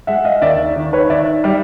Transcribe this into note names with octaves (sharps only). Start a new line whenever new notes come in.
G#3 E5 F#5
D#5 F5
D#2 D5 E5
D#3
B4 C#5
D#3 D5 E5
G3 D5 E5